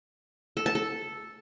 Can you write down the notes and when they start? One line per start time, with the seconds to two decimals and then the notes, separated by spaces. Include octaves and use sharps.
0.57 A4
0.66 A5
0.75 A4